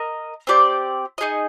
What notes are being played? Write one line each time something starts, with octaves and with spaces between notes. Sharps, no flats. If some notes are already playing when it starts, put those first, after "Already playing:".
Already playing: A#4 D#5
C4 G4 D5
D#4 G#4 D#5